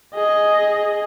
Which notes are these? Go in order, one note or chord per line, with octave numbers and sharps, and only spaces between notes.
G#4 D#5